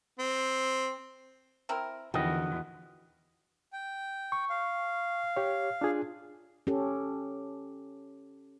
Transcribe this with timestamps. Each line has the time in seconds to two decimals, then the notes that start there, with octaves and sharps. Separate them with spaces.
0.19 C4
1.69 C4 E4 A#4
2.14 E2 D3 D#3 F3 G3 F#4 D#5
3.73 G5
4.32 C#6
4.50 F5
5.36 G4 C#5
5.81 D4 F4 G#4
6.67 C#4 G4 A4